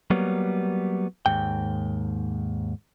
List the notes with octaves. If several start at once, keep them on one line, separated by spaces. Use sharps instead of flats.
F#3 G3 A#3 B3
D#2 G#2 G5